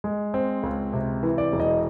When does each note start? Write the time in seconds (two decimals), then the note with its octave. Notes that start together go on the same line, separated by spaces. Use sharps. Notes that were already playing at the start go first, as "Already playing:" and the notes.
0.04 G#3
0.34 C4
0.63 C#2
0.93 C3
1.23 E3
1.38 D5
1.52 E1
1.60 D#5